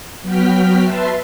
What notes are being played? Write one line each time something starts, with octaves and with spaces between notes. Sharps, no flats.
F#3 B3 F#4 G5 F6 B6
B4 E5 A5 C6